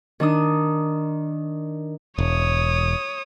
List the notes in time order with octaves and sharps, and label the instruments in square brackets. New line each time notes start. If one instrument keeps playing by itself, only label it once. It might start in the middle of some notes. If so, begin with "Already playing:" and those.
[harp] D#3 D4 D#6
[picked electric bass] E1 [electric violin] C#5 D#6